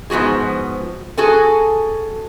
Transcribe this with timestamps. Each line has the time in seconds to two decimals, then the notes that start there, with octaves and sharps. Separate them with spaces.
0.10 G#2 F3 B3 F#4 G#4
1.18 F#4 G#4 A4 G#5